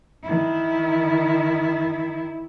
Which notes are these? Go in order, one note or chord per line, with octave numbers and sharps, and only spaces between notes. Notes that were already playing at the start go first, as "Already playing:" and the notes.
D#3 E4